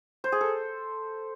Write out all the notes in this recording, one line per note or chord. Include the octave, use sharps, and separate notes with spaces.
C5
G#4
A4